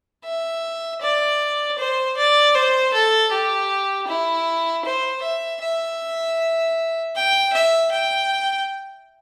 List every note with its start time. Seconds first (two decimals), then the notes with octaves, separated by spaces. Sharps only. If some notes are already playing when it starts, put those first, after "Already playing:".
0.25 E5
1.01 D5
1.78 C5
2.17 D5
2.55 C5
2.94 A4
3.32 G4
4.08 E4
4.85 C5
5.23 E5
5.62 E5
7.15 G5
7.53 E5
7.92 G5